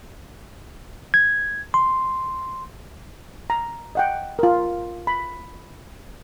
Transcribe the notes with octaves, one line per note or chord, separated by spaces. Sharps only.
G#6
C6
A#5
D#5 F#5 G5
F4 A#4
B5